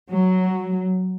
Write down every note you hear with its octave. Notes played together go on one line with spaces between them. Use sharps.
F#3